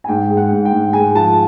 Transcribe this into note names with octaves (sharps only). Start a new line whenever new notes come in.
G#5
G#2 G5
G#3
F#5
G#2
G5
G#2
G#3 G#5
F3 A5